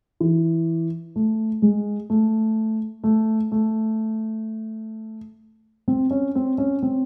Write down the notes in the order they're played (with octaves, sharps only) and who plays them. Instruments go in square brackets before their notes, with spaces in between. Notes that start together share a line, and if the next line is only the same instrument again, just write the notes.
[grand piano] E3
A3
G#3
A3
A3
A3
C4
C#4
C4
C#4
C4